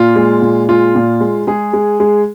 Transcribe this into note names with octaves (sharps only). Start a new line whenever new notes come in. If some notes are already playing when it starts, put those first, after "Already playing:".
Already playing: A#2 F4
G#3
A#2
G#3 F4
A#2
G#3
G#3 G#4
G#3
G#3